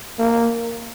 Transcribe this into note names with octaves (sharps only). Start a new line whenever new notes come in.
A#3